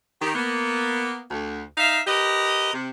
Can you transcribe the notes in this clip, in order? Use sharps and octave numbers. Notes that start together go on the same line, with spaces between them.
D#3 G4
A#3 B3
D2
D#4 E5 F5
G4 A#4 B4 D#5
C3